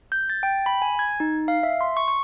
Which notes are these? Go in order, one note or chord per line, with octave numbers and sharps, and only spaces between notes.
G6
A6
G5
B5
G#5
G#6
D#4
F5
E5
C6
C#6
C#6